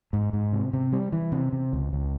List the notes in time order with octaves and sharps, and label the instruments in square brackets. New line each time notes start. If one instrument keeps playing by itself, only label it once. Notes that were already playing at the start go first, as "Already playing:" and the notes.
[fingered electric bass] G#2
G#2
C3
C3
G3
E3
C3
C3
C#2
C#2